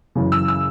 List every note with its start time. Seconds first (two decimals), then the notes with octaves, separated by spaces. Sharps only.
0.15 F#2 C#3 E3
0.32 E6
0.48 E6